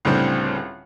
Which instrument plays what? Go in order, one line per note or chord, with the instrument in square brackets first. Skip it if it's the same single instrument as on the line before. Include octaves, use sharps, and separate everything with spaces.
[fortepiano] C#2 A2 D3 G3 C4